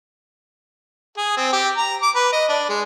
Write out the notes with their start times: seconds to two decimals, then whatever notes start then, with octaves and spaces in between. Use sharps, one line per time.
1.17 G#4
1.37 C4
1.53 G4
1.77 A#5
2.02 D6
2.15 B4
2.32 D#5
2.49 D4
2.69 G#3